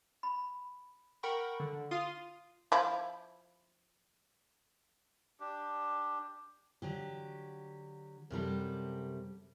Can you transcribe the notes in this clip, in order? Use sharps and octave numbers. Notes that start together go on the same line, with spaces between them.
B5
A#4 F#5 G5 B5 C#6
D3
F4 F5 C6 D#6 D#7
F3 E4
D4 G4
D3 F#3 G4
F#2 C3 G3 A4